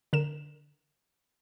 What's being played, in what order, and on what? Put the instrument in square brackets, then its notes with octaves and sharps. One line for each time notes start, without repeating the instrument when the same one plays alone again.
[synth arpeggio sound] D3 A#4 E7